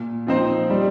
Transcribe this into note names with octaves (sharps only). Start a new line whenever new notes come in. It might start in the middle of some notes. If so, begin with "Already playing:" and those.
Already playing: A#2
F3 C4 D#4 C5
G3